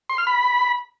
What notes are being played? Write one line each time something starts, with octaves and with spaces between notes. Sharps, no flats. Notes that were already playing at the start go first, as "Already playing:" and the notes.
C6
F6
B5